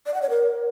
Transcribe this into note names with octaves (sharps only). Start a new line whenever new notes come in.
D5
F#5
C#5
A#4